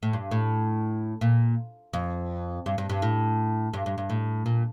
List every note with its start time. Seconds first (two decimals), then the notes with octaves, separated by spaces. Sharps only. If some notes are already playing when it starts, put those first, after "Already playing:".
0.03 A2
0.13 G2
0.31 A2
1.21 A#2
1.93 F2
2.66 G2
2.78 G2
2.90 G2
3.02 A2
3.74 G2
3.86 G2
3.98 G2
4.10 A2
4.46 A#2